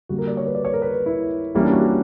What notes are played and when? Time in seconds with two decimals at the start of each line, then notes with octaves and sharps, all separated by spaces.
0.09 D3 G3 A#3 F#4
0.19 A#4
0.27 D5
0.37 C#5
0.47 B4
0.55 D5
0.65 C#5
0.74 A#4
0.82 B4
1.06 E4
1.54 E3 G3 A#3 C#4 E4
1.64 D4
1.73 F#4
1.81 G4